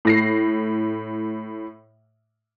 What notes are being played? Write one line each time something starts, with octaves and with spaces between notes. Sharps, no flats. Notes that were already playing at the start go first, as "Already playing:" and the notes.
A2 A#6 C7